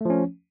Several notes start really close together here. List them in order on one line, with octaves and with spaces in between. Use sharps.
A3 F3 C#4